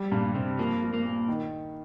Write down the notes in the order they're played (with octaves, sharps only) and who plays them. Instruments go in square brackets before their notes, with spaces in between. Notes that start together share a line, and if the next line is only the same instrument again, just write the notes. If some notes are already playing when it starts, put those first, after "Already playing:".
Already playing: [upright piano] G3
[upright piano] G2 [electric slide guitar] A#2
[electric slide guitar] C3 [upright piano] C4
[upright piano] F3 [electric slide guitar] A#3
[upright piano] F3
[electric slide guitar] A#3
[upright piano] A#2
D#3